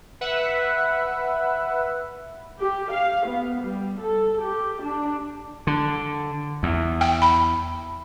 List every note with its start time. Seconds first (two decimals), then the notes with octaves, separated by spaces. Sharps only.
0.21 B4 E5 F#5
2.60 G4
2.91 F5
3.26 B3
3.61 G3
4.00 A4
4.41 G4
4.82 D4
5.67 D3
6.63 E2
7.01 G5
7.22 B5